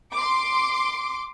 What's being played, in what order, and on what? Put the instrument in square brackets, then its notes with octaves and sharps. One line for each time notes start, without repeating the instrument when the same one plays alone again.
[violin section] C6 D6